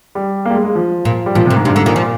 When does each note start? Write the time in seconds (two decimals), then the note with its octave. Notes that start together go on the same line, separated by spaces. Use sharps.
0.15 G3
0.45 A#3
0.50 G3
0.55 G#3
0.65 G#3
0.75 F3
1.05 A#2
1.26 G3
1.35 A#2 F3
1.45 C3
1.50 A#2
1.56 G#2
1.65 G2 C3
1.75 G#2 D3
1.86 A#2 D#3
1.96 F3